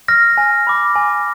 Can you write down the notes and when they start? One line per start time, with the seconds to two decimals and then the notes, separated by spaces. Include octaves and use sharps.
0.08 F6 A#6
0.37 G#5
0.67 B5 D6
0.96 G#5